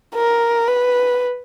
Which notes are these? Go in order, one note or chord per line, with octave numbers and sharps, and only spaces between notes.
A#4
B4